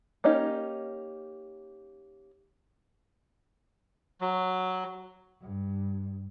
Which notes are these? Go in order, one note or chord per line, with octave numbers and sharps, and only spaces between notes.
A#3 C#4 D#4 G4
F#3
G2